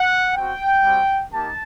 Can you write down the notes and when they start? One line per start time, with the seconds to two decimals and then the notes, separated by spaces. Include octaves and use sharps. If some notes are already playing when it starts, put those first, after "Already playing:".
Already playing: F#5
0.35 C4 F#4 G5
0.84 G3 C4 F#4
1.32 A#3 D#4 G4 A5